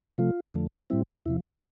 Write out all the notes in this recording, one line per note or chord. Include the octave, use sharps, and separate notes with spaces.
C3 F3 A3 F4
F2 D3 F3 A3
A2 G3 C4 E4
E2 C3 F3 E4